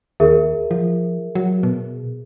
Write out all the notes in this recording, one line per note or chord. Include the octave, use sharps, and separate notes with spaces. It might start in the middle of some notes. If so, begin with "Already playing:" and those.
D#2 G#4 A#4 E5
F3
F#3
B2